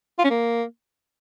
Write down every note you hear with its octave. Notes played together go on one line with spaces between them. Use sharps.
F4
C#4
A#3